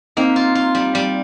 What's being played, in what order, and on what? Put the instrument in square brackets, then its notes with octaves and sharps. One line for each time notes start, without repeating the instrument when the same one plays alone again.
[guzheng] A#3 [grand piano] C4 D#4
[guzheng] F4
F4
G3
G3